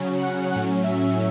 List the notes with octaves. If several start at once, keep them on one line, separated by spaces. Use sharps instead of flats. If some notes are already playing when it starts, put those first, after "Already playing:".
Already playing: C#3 F#3 C#4
F#5
A2 F#3 C#4 F#5
E5